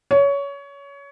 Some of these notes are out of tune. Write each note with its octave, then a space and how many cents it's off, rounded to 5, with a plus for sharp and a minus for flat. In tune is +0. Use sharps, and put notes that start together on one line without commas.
C#5 +20